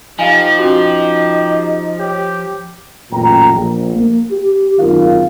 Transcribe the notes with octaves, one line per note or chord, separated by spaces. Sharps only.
F3 D#4 G4 D#5 F5 G#5
C#4 F#4
G4 C#5
A1 F#2 A#2 G5 A#5
A#1
A#3
G4
G#1 F#2 D#3 F4 A#4 F5